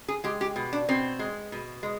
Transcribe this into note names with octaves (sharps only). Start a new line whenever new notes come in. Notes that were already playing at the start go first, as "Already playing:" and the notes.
G#4
G#3 G4
G4
B2
D4
B2 C4
G#3
B2
G#3